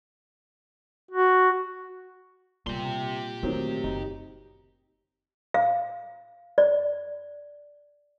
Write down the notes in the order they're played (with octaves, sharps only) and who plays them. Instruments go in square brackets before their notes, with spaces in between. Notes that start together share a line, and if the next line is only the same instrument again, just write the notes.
[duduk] F#4
[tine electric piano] A#2 [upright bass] G3 B3 [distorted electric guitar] G4 C6
[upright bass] D3 A3 [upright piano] D#3 F#3 C4
[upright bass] F#1 [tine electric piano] D#4
[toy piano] F5
D5